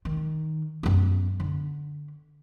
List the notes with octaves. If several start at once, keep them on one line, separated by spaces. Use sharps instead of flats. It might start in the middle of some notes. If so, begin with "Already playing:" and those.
D#3
F#2 B3
D3